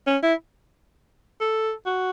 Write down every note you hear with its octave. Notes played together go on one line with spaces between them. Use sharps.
C#4
E4
A4
F#4